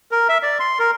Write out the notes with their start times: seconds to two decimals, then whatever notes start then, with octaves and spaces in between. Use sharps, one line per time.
0.11 A#4
0.29 E5
0.43 D5
0.60 C6
0.79 A#4